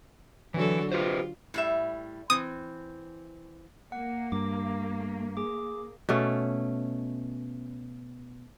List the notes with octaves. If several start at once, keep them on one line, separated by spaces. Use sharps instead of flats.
D3 E3 F#3 A4
F4 G4 B4 C5
A2 G3 E5
E3 C4 D#6
A#3 F#5
G2 D6
G#4 D6
B2 A3 C#4